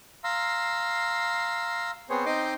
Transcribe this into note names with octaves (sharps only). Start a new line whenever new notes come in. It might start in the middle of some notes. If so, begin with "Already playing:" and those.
F5 A#5 C6 E6
B3 C4 G#4 C5 C#5
C4 D#4 D#5 G5 C6 D6